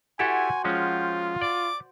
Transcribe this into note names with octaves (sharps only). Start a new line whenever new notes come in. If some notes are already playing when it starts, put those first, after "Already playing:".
E4 F#4 G4 A4 C5 F#5 G#5
F3 G#3 C#4 F4 G5
D5 D6